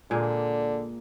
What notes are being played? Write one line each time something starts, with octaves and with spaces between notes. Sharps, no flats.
A#2 D3 G#3 A#3